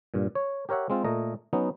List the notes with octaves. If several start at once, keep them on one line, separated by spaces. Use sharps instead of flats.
G2 A#2
C#5
G4 A#4 C#5 E5 F#5
G#3 C4 F4
A#2 A3 D#5 A#5
F#3 B3 C#4 D#4